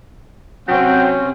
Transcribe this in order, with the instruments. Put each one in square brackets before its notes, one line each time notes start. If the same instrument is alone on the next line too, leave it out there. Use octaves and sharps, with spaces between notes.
[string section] C3 C4 [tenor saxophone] F#3 [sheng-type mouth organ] C#4 [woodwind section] F#5 G5